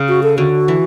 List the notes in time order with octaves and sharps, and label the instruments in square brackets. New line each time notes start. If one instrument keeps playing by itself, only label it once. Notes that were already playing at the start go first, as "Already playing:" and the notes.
Already playing: [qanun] C#3
[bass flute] F#4
A4
[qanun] D3 [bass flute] F#4
[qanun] E3